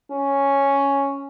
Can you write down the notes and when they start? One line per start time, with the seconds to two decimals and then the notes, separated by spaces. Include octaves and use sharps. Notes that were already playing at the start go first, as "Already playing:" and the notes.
0.12 C#4